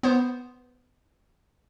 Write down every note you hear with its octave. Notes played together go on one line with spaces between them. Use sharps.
B3 C5